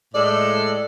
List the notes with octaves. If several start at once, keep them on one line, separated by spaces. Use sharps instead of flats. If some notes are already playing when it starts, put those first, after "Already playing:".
A2 G#3 A4 D5